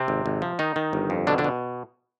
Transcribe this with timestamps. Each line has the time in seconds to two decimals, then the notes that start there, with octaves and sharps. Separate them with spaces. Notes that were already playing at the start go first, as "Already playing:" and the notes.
Already playing: C3 C4
0.08 G#1
0.26 G#1
0.42 F3
0.59 D#3 D#4
0.76 D#3
0.93 G1
1.10 F2
1.27 B2 D3 D4
1.38 D3 D4
1.44 B2